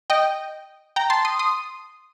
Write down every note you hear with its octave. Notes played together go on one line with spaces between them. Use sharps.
D#5 G5
G5 A#5
A5 C6
C6 D#6
C6 D#6